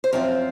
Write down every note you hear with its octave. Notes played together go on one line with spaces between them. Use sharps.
C5
F#2 F3 C4 F4 A#4